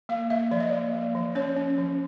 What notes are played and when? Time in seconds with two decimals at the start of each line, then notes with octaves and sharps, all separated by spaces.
0.09 A#3 F5
0.30 A#3 E5
0.51 F3 D5
0.60 D#5
0.69 A#3 D5
0.93 A#3
1.15 F3
1.35 C#4 C#5
1.56 C#4
1.78 F3